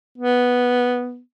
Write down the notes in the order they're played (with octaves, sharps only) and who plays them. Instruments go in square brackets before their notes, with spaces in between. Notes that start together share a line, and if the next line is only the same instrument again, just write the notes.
[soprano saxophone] B3